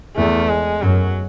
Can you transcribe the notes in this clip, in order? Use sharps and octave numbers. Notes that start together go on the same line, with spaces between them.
E2 A3
G#3
F#2 F#3